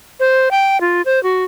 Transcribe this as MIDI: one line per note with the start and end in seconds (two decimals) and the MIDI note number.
0.20 0.49 72
0.51 0.80 79
0.81 1.02 65
1.05 1.22 72
1.23 1.44 66